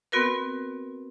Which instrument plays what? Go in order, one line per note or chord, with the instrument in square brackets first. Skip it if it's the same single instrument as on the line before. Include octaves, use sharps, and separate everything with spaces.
[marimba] B3 C4 F#4 A#4 B4